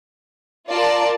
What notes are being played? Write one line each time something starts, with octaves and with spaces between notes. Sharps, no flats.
F4 A#4 D5 A5